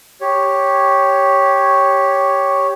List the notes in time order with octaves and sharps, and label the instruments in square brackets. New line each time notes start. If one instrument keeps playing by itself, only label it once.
[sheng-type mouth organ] G4 C#5